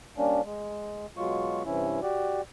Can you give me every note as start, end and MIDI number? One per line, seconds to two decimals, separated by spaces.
0.18 0.41 55
0.18 0.41 58
0.18 0.41 61
0.18 0.41 62
0.45 1.06 56
1.17 1.63 47
1.17 1.63 54
1.17 1.63 56
1.17 1.63 65
1.17 1.63 85
1.65 2.00 43
1.65 2.00 48
1.65 2.00 52
1.65 2.00 61
1.65 2.00 64
2.02 2.41 66
2.02 2.41 67
2.02 2.41 74